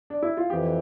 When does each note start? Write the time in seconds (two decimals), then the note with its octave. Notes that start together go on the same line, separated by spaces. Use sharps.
0.10 D4
0.22 E4
0.37 F4
0.50 F2 E3 G4